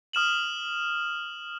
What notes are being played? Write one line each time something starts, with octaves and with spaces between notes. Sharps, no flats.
D#6 F6 E7 F#7